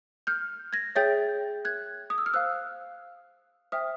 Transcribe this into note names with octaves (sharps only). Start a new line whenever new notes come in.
F6 G6
G#6 A#6
G#4 C#5 E5 G5 G6 A6
F#6 G#6
D#6
E6
F6
C5 F5 E6 F#6
C5 E5 G5 D#6 F6